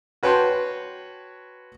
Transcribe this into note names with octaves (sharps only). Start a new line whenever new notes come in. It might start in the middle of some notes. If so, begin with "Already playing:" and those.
F#4 B4 C#5 G5 A5 C6